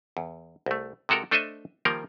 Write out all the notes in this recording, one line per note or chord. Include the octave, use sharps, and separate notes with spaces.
E2
C2 A3
C3 G#3 F#4 A4 A#4
A3 D4 A4 C5 D#5 E5
D#3 F3 G3 A#3 A#4